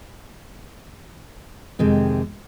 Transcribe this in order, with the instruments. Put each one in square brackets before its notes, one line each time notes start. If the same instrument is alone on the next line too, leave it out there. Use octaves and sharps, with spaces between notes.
[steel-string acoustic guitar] F2 C3 D#3 G#3 C4